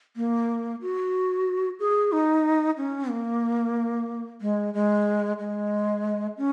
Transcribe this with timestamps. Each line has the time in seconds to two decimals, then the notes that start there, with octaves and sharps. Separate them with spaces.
0.17 A#3
0.81 F#4
1.80 G#4
2.12 D#4
2.77 C#4
3.10 A#3
4.41 G#3
4.74 G#3
5.39 G#3
6.37 C#4